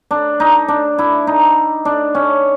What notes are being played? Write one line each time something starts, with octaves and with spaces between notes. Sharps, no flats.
D4
D#4
D4
E4
D#4
D4
C#4